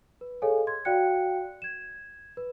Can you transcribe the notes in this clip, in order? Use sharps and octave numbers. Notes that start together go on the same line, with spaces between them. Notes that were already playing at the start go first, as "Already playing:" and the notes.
B4
G#4 A4 C#5 D#5 F5 G#5
C6 G#6
F#4 D5 F5 G5 F#6 C#7
G#6 E7
B4